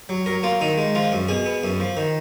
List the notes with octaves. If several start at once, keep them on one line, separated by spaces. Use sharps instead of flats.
F#3
F#3 A#4
A#3 F4
D#3 D#4
G#3
F3 F4
F#2
B2 G#4
B3
F#2
F3
D#3